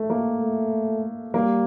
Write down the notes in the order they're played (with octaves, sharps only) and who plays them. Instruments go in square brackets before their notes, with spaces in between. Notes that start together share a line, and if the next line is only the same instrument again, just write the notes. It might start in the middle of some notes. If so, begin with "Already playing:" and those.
Already playing: [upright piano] A3
A#3
[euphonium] A3
[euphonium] G3 [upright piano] A#3